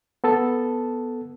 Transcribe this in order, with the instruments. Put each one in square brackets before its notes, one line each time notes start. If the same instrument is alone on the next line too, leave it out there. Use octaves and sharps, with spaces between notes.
[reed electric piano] B3 A4 A5